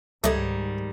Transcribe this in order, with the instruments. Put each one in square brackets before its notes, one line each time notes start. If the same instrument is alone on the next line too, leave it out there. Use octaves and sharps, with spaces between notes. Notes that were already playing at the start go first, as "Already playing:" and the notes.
[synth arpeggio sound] C#2 G#6 [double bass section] G#2 [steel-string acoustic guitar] D#3 G3 [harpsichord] A3 D#5